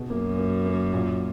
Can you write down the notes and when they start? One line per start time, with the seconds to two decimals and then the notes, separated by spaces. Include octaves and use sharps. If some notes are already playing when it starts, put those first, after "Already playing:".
Already playing: B2 G#4
0.10 F#2 A#3
0.38 A#3
0.66 A#3
0.93 A#2